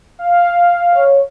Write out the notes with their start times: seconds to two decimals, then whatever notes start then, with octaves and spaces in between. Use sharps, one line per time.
0.19 F5
0.93 C#5